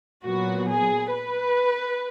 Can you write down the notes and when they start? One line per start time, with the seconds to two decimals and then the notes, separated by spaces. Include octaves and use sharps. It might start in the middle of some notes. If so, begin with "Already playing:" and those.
0.24 A#2 F#3 B3 F#4
0.69 G#4
1.14 B4